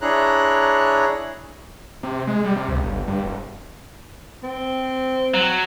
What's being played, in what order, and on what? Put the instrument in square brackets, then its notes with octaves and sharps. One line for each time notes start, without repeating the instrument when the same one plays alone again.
[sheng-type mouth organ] D4 E4 G#4 C#5 A#5 F#6
[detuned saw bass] C3
G#3
G3
C3
C#2
G1
G2
E1
[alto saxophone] C4
[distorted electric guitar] F#3